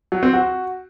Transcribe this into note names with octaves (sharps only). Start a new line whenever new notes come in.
F#3
C4
F#4